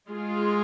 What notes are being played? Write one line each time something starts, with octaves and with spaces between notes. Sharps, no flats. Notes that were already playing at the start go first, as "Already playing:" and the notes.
G#3 F4 G#4